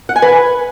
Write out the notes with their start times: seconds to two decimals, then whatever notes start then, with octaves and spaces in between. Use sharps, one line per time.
0.09 F#5
0.16 G#5
0.22 B4